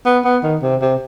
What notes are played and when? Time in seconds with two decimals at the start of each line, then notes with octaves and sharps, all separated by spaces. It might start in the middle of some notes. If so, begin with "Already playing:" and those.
0.06 B3
0.24 B3
0.43 D#3
0.62 C3
0.82 C3